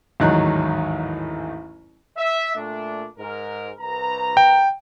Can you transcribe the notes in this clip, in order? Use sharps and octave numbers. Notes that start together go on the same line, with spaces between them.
A1 D#2 G#2 F#3 D#4 F#6
E5
A#2 A3 D4
G#2 A#4
C2 B4 A#5
G5